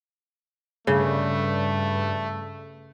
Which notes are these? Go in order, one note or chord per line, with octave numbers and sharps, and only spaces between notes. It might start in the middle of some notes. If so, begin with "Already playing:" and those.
G2 C#3 A3